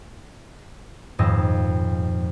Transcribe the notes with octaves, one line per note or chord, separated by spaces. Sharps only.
D#1 F2 G#2 D#5 E6